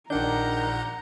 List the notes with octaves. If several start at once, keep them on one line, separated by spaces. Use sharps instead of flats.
A#1 D#3 D4 F#5 A#5 G6